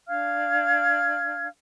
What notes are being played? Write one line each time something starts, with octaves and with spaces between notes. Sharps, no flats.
D4 F5 F6 G#6